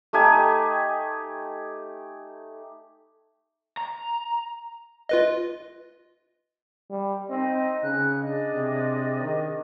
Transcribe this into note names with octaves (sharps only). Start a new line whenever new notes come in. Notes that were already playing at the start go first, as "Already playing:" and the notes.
A3 D#4 G4 G#5
A#5
F4 B4 D#5
G3
C4 D#4 D#5
C#3 F#6
D4 G#4 D#5
C3
D#3